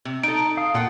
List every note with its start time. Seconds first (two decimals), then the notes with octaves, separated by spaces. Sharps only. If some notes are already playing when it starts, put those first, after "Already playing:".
0.05 C3
0.23 D#4 A4 A#5 D7
0.57 F5 D#6
0.74 A#2 F4 F#5 G5